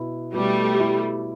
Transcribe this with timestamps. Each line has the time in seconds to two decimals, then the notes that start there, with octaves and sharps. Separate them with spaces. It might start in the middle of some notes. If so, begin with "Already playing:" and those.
Already playing: B2 E4
0.34 B2 G3 A3
0.80 E4